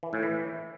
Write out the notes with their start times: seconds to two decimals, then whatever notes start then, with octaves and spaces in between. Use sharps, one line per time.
0.03 E3
0.13 A2
0.23 E3